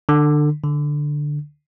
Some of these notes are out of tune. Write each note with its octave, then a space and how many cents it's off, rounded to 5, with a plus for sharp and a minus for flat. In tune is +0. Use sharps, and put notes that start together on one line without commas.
D3 +25
D3 +5